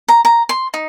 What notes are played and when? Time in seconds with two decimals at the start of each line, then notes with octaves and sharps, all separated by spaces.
0.08 A#5
0.25 A#5
0.49 C6
0.74 D#4